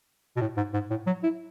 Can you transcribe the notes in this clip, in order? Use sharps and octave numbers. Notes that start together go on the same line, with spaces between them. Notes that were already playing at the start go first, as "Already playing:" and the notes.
B2
A2
G#2
G#2
A2
F#3
E4